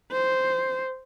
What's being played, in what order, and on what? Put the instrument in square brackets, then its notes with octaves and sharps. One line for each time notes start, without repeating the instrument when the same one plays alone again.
[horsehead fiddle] C5